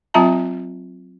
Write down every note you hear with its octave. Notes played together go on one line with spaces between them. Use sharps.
F#3 C4 F4 E5 A5 A#5